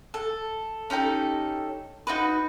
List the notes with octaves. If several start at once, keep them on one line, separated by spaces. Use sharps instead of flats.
A4
C#4 D#4 G4 A4
D#4 F#4 B4